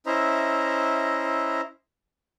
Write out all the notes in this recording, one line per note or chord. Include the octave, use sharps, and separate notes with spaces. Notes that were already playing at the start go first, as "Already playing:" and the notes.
C#4 E4 C5 D#5 E5 A#5